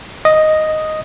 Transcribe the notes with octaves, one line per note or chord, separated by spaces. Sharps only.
D#5